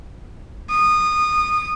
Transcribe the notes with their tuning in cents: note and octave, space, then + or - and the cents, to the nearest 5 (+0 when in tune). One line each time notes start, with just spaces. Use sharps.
D#6 -25